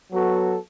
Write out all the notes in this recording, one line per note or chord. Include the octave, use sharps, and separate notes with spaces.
F#3 B3 F#4 A4